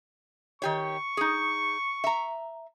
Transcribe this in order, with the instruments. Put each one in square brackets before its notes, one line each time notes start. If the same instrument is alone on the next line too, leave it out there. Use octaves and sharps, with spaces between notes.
[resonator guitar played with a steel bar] D#3 G4 C#5 [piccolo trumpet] C#6
[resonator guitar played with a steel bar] D#4 G#4
E5 A#5